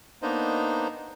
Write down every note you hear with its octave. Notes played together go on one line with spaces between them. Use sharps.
A#3 B3 D4 D#4 C5 D#5